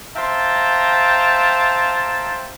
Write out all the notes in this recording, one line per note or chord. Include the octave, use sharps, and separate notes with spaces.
C5 E5 F5 G5 A5 A#5